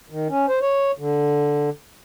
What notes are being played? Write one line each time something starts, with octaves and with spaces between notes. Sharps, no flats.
D#3
C#4
C5
C#5
D3